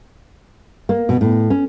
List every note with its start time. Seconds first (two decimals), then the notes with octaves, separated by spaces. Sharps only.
0.89 A#3
1.09 B2
1.21 A2
1.50 C#4